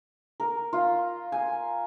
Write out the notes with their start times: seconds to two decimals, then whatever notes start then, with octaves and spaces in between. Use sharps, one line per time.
0.40 A#4
0.73 F4
1.32 G#5